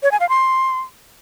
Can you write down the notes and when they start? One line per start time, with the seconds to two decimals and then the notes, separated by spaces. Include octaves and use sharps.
0.03 C#5
0.12 G#5
0.20 F5
0.29 C6